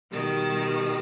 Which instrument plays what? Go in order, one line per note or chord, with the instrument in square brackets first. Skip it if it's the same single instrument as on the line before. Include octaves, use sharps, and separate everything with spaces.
[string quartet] B2 D#3 [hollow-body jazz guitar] G3
[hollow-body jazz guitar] G3